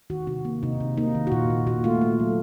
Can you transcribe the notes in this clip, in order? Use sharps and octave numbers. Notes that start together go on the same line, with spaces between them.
D#3 F#4
C3 F#4
A#3
C3 D#4
C3
A#3 D#4
D#3
F#4
A#2 F4
A#2
A#2 F#4
A3 F4
A3
F#3